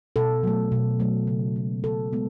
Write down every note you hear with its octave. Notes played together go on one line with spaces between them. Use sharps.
B2 A4
F#3 A3
B2
F#3 A3
C#3
G#3 B3
C#3 A4
G#3 B3